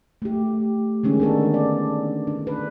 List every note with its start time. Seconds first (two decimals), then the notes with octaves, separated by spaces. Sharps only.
0.22 A3 G4
1.03 D3 D#3 G#3 C#4 D#4
1.20 B3 D4 A4
1.54 D5
2.27 D4
2.47 B4